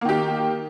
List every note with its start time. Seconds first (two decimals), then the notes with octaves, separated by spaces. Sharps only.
0.01 A#3
0.05 D#3
0.09 G4